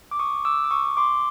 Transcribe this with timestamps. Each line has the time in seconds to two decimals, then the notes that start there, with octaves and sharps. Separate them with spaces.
0.11 D6
0.19 C#6 D#6
0.45 D6 E6
0.64 D6
0.71 C#6 D#6
0.97 C6 D6